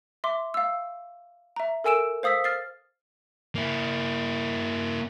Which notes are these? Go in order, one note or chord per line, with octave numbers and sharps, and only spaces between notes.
E5 C6 D6
F5 E6
E5 A#5
A4 A#4 G#5 E6 D7 E7
C5 F5 D#6 E6 B6
F6 A6 C7
A#3 E4